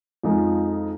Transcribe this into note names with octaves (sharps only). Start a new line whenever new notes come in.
F2 F3 G#3 D#4